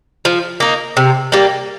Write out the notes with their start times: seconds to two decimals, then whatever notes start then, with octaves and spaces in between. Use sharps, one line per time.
0.25 F3
0.60 A#3 D#4
0.97 C3
1.32 G3 A#3